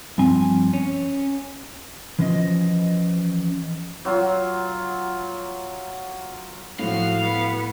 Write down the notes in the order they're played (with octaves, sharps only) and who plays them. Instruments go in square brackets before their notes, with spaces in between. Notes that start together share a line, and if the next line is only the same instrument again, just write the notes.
[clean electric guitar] G2 F3 C4 G#5
C#4
[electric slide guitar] E3 F3 C#4 C5 D#5
[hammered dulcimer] F#3 F4
[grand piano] A2 [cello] F3 F#4 [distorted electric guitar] F5
[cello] B3